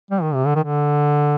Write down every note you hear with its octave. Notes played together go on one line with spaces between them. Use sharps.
G3
D#3
C3
D3
D#3
D3